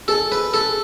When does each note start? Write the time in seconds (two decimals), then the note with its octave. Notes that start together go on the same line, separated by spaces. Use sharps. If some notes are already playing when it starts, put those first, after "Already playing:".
0.08 G#4 A4
0.32 G#4 B4
0.54 G#4 A4